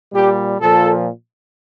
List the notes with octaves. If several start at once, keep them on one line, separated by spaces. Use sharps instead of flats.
A#2 G3 G4
A#2 F3 A4